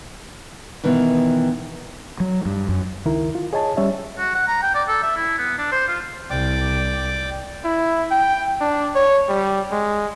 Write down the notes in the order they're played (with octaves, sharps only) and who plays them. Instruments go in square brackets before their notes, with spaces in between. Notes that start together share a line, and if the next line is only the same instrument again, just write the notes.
[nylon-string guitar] B2 D#3 E3 B3
[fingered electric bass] F#3
G2
F#2
[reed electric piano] C#2 D#3 E4 A#4
F4
G#4 C#5 D#5 G#5 A5
G3 C#4 C#5 E5
[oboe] F#4
F#5
A#5
G5
D5
A4
E5
E4
B3
D4
C5
F4
[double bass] C2 [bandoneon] D5 G5 D6
[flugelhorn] E4
G5
D4
C#5
G3
G#3